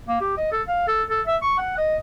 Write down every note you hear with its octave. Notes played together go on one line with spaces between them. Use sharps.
A#3
G4
D#5
A4
F5
A4
A4
E5
C#6
F#5
D#5